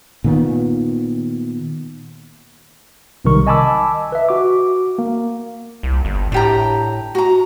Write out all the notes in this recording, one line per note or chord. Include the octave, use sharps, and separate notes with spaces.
A#2 D#3 B3
B1 C3 D#3 G3 A#4 C#6
D#5 G#5 A5 B5 D6 E6
B4 E5
F#4 D6
A#3
C2
G1
A2 D4 G4 A#5
F#4 A#5